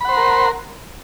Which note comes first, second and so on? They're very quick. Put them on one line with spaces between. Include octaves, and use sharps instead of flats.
B5 F#5 C5 C6 A#4